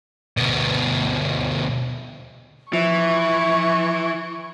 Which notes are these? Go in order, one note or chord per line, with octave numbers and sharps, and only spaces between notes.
D2 B2
E3 F3 E5 C#6